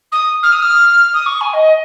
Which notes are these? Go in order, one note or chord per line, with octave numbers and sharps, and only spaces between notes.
D#6
F6
D#6
F6
D#6
C#6
G#5
D#5